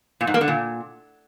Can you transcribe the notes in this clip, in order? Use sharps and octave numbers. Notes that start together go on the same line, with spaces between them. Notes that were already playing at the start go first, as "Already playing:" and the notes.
A#2
G#2
A#3
D3
A#2